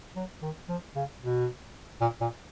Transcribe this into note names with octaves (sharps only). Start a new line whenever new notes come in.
F#3
D#3
F3
C#3
B2
A#2
A#2